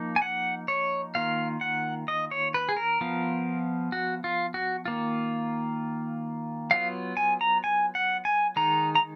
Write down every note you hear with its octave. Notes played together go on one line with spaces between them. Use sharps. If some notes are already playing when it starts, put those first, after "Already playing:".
Already playing: F3 A#3 D#4
G#5
F#5
C#5
D#3 A#3 F4 F5
F#5
D#5
C#5
B4
G#4
A#4
F3 B3 F4
F#4
F4
F#4
D#3 A#3 F4
F#3 B3 F4 F5
G#5
A#5
G#5
F#5
G#5
D#3 G#3 D#4 A#5
A#5